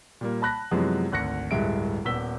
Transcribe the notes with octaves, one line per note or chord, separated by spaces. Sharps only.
A#2 G3 A#3
A5 B5 F#6 A#6
F#2 C3 E3 F3 G#3 B3
G#1 D2 F#6 A#6 C#7
D1 G2 G#3 E5 D7
D#1 B3 E6 B6 G7